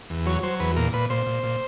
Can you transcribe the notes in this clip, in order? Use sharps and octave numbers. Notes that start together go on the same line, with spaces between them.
E2
F#3 C#5
F#3 C5
E2 B4
A#2 A#4
A#2 B4
A#2 C5
A#2
A#2